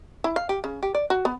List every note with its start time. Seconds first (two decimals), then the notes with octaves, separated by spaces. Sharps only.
0.24 E4
0.36 F5
0.49 G4
0.64 C#3
0.83 G4
0.95 D5
1.10 F#4
1.25 B3